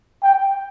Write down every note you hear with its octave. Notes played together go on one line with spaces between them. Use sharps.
G5